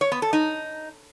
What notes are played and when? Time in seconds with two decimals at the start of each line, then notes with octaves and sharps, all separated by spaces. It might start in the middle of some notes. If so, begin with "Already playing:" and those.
0.01 C#5
0.12 B3
0.22 A4
0.33 D#4